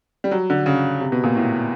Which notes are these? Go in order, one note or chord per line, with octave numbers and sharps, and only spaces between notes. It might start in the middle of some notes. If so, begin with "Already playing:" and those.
G3
F#3
D3
C#3
C3
B2
A#2
A2